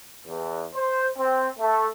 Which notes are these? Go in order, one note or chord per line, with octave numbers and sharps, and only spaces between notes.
E2
C5
C4
A3